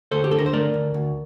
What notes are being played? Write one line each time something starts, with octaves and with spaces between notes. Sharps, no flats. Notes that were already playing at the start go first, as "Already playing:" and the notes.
D2 A4 C5
G4
D3 A4
A#4
C5
A3 A#4 D5
D2
D2